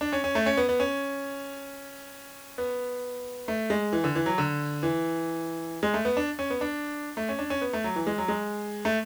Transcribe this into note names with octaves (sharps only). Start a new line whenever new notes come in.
D4
C#4
C#4
A3
C#4
B3
B3
C#4
B3
A3
G#3
E3
D3
E3
F#3
D3
E3
G#3
A3
B3
D4
C#4
B3
D4
A3
C#4
D4
C#4
B3
A3
F#3
E3
G#3
F#3
G#3
A3